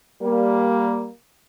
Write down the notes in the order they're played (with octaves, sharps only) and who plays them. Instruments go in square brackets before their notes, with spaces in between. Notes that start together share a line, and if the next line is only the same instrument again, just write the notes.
[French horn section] G3 A#3